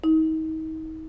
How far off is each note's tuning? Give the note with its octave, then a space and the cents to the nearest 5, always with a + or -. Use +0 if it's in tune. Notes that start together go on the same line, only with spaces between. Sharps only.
D#4 +35